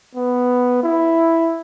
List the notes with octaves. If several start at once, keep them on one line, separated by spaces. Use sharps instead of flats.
B3
E4